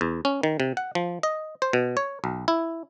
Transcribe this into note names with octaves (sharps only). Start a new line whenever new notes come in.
E2
C#4
D#3
C3
F#5
F3
D#5
C5
B2
C#5
B1
E4